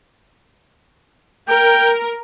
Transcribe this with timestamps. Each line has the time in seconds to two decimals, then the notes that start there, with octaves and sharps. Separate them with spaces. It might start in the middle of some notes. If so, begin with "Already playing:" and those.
1.49 A#4 G5